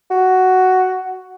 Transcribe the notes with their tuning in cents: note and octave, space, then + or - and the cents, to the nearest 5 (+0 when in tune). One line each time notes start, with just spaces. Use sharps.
F#4 +5